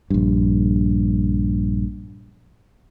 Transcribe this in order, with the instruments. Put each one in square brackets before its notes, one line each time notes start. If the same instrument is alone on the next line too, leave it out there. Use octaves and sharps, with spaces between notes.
[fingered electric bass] A#1 G2